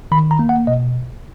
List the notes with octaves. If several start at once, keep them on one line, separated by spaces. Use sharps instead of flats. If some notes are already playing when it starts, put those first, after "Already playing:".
D#3 B5
A#5
A#3
F#5
B2 D#5